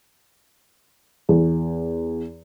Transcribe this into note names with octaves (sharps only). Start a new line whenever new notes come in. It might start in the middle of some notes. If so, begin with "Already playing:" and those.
E2